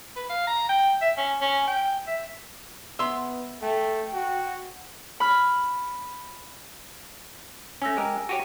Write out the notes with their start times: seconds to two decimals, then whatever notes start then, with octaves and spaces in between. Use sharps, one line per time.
0.16 B4
0.30 F5
0.47 A#5
0.69 G5
1.02 E5
1.17 C#4
1.41 C#4
1.67 G5
2.07 E5
2.99 B3 E5 C6
3.62 A3 G5
4.14 F#4
5.20 B5 F6
7.82 A3 C#4 G#5 E6 A#6
7.97 G#3 G4 A#4
8.29 F#4 G4 C#5 D#7